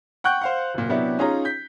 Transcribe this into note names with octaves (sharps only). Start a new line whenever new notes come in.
F#5 G5 C#6 F#6 G6
C5 F5 F#5
F#1 A#2
C3 F#3 B3 D4 E4 G4
C#4 D#4 F4 G#4 C#5 A#5
G6 B6